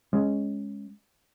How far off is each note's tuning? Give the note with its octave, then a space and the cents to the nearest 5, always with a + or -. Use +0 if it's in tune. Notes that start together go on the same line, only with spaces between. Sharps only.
G#3 +0 C#4 +0